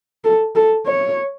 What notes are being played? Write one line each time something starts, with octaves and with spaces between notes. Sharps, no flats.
A4
A4
C#5